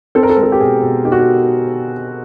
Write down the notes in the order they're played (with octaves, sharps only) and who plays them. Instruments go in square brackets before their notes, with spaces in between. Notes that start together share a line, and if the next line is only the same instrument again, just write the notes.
[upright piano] C4 A4
A#4
A4
G#3 A#4
A4
G4
B2 G#4
B2
D#4 G4
F#4
G4